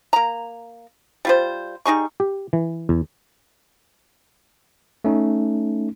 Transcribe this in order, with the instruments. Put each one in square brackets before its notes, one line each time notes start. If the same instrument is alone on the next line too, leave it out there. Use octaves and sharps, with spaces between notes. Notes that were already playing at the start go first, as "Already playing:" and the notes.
[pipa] A#3 A#5
G3 F4 C5
G3 D#4 G#4 C#6
[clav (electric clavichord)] G4
E3
E2
[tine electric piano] A3 C#4 D#4